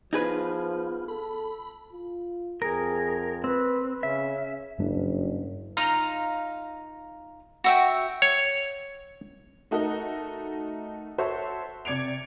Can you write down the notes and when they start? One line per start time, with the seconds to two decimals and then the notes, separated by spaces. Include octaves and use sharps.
0.13 F3 B3 D#4 F4 G#4 B4
1.08 A4 B5
1.93 F4
2.62 F2 G#4 A#4
3.44 C4 B4
4.03 C#3 C#4 E5
4.78 F#1 G2 G3 D4
5.77 D#4 F4 F5 A#5
7.64 F#4 E5 G5
8.22 C#5
9.71 A3 D#4 F#4 A4 A#4 D#5
11.18 F#4 A4 C5 C#5 E5
11.85 C3 D5 G#6 C#7 D7 F7